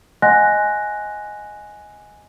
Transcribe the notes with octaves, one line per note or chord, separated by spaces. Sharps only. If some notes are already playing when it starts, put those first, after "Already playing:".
D#5 F#5 G#5 C6 F#6 A#6